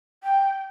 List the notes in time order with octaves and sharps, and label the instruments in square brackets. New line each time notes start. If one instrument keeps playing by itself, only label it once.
[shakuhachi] G5